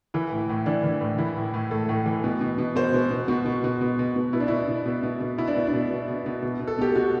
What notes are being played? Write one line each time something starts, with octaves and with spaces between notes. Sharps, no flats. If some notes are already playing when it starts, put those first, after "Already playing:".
E3 E4
A2
A2
E3 D4
E3
A2
E3 E4
A2
A2
A2 A4
A2
E3
B2
B2
B2
B2 C5
B2
B2
B2 F#4
B2
B2
B2
B2
B2
B2 E4
D4
B2 E4
B2
B2
B2
B2
B2 E4
D4
B2
D4
B2
B2
B2
B2
B2
B2
A4
B2 G4
B2 F#4